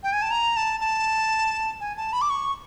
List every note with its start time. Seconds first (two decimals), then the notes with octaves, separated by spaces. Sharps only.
0.03 G5
0.13 G#5
0.22 A5
0.31 A#5
0.57 A5
0.81 A5
1.80 G#5
1.97 A5
2.13 B5
2.22 D6
2.30 C#6